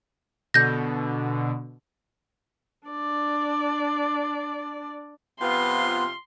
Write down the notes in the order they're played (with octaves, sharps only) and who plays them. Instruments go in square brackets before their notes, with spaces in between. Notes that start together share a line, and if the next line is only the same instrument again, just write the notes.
[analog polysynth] B2 D3 [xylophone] G6 A#6
[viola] D4 D5
[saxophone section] C3 F3 F4 [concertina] B3 B4 [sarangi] C6